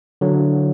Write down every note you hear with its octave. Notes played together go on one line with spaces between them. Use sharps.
D3 F#3